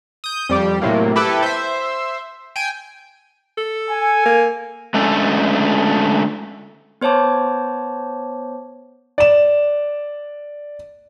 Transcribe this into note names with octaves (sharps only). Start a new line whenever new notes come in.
D#6 G6
F2 G3 G4
A2 C3 F#3 A#3
E4 G4 A4 B4
C5 E5
G5 G#5
A4
G#5
A#3
D3 G#3 A3 C#4 A4
B3 C5 C#5 A5 D6
D5 E7